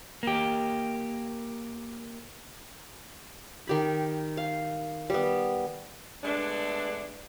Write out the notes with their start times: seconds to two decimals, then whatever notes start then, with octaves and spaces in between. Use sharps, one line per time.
0.23 A#3 G4
3.67 D#3 G4 B5
4.37 F5
5.10 G3 B3
6.24 G#3 A3 B3 D4